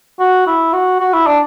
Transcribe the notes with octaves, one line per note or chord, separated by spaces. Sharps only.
F#4
E4
F#4
F#4
E4
D4